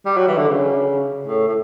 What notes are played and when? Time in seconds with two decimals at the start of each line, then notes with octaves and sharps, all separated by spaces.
0.06 G3
0.17 F#3
0.28 E3
0.37 D3
0.48 C#3
1.26 A2
1.48 A2